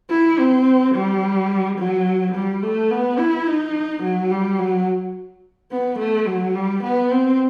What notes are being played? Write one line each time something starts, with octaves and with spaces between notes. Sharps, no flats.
E4
C4
G3
F#3
G3
A3
B3
E4
D#4
F#3
G3
F#3
B3
A3
F#3
G3
B3
C4